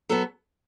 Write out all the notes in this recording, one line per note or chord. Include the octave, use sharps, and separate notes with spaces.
F#3 B3 A4